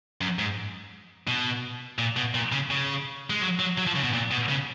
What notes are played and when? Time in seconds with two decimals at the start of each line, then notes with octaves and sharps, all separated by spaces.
0.21 F#2
0.39 G#2
1.28 B2
1.99 A#2
2.16 B2
2.34 A#2
2.52 C#3
2.71 C#3
3.30 G#3
3.41 F#3
3.59 F#3
3.78 F#3
3.87 F3
3.95 C#3
4.03 B2
4.13 A#2
4.31 B2
4.49 C#3